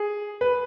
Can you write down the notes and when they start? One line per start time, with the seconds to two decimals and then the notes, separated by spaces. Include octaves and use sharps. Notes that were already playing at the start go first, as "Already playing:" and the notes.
Already playing: G#4
0.41 B4